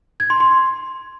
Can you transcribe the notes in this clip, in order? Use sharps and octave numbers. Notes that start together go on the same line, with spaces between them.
G#6
C6
C6